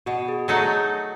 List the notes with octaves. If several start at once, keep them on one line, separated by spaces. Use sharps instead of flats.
B2 F#4
G#4
F#3 A3 D#4 F#4 G#4